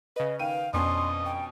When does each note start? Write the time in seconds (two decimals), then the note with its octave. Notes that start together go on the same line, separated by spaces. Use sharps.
0.16 C#3 B4 D#5
0.39 D#3 F5 G5 D#7
0.74 F2 B2 C#4 D4 D#5 C6
1.26 G5